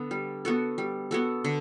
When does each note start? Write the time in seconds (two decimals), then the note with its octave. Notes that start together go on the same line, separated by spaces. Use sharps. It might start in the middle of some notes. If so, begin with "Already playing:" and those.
Already playing: D3 B3
0.11 G3
0.45 B3 F#4 A4
0.78 G3
1.11 B3 F#4 A4
1.44 D3